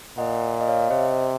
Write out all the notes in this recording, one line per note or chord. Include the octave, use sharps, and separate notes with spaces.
A#2 D#5 F#5
F5
D#5
C#5 F5
C3 C5 D#5